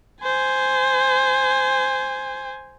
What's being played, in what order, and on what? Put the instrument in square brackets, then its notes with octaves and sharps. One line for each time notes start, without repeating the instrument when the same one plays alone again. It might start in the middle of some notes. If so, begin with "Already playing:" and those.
[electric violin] C5 G#5